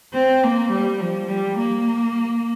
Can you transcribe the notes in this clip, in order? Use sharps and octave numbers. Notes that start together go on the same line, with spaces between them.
C4
A#3
G3
F3
G3
A#3